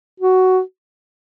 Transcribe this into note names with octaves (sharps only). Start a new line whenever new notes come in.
F#4